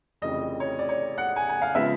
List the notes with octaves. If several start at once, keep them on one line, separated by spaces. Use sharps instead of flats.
F1 F2 C#3 E3 D#5
C#5
D5
C#5
F#5
G#5
G#5
F5
C#3 F3 G#3 B3 E5